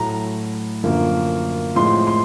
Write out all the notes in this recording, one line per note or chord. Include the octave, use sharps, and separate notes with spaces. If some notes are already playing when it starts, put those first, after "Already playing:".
Already playing: A2 F#3 A3 A#5
F#2 D3 F3 A#3
A2 F3 G#3 C4 C6
C6